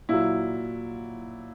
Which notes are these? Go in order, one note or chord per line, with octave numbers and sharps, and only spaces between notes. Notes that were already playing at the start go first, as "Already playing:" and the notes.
A#2 F#3 E4